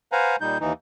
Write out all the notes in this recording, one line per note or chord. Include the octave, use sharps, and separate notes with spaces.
B4 C5 F5 F#5 G#5 A#5
A#2 G3 D#4 G6
D#2 E3 D#4